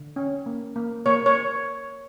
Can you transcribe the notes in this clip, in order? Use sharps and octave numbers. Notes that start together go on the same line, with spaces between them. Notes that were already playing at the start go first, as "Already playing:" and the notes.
Already playing: D3
C#4
A#3
A#3
A#3 C#5
C#5